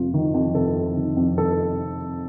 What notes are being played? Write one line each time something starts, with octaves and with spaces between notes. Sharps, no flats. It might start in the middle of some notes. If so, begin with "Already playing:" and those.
Already playing: F2 C3 F4
D#3
F2
C3 A4
F2
D#3
F2
C3 A4